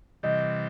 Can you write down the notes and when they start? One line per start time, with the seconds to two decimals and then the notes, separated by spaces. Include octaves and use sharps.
0.23 C3 E3 G3 D#5